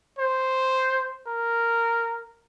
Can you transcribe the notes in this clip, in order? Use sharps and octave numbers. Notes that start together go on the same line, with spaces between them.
C5
A#4